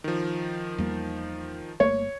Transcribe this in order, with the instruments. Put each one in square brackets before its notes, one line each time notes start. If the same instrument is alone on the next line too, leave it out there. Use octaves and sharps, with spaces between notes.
[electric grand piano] D#3 F3
[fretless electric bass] E2 G3 A#3
[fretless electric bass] G1 A3 A#3 [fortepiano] C#5